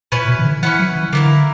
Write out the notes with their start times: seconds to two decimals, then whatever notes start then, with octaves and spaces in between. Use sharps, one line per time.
0.12 A#2 C#4 E4 B4
0.28 B2
0.39 E3
0.45 D3
0.62 E3 C#4 E4 B4 F#5
0.79 F#3
0.96 E3
1.13 D3 A#3 E4 A#4